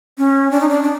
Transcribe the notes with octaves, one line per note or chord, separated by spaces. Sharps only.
C#4
D4
D#4
D4
D4